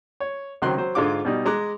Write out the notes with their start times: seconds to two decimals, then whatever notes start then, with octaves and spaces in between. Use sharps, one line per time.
0.20 C#5
0.62 C#2 D#3 F#3 C4 C6 F#6
0.78 F#3 C5
0.95 G#2 D3 G#3 F4 D6
1.25 B2 G3 D#4
1.46 G#3 A#5 D6 F#6